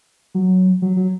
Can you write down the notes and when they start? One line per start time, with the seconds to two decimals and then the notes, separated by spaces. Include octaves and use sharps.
0.35 F#3
0.82 F#3
0.97 F#3